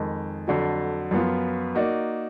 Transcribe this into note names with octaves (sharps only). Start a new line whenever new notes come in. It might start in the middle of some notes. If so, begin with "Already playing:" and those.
Already playing: F2 D#3 G#3
F2 D3 F#3
F#2 F3 B3 F4
A#3 D#4 F#4 D5